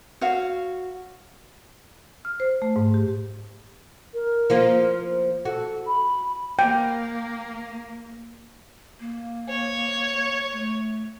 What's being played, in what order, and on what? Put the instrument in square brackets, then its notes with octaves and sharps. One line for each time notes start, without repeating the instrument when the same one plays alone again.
[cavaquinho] F#4 C#5 F5
[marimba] F6
C5
A3
G#2
G4
[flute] A#4
[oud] F3 A#3 F4
[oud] F#4 [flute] A4
[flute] B5
[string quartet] A#3 [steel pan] G5
[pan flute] A#3
[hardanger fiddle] C#5
[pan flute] A3